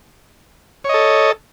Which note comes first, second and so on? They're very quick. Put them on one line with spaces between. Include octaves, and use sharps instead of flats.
C#5 D#5 A4